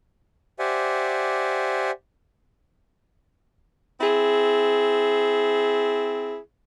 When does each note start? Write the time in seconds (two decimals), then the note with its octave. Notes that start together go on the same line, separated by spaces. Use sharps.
0.59 G4 C5 D5 E5 F#5 G#5
4.01 C4 E4 G#4